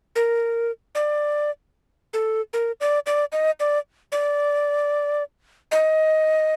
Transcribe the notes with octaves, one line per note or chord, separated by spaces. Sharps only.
A#4
D5
A4
A#4
D5
D5
D#5
D5
D5
D#5